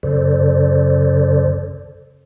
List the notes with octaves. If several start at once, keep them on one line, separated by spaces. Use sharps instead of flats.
F#2 C#3 A4 C5 D5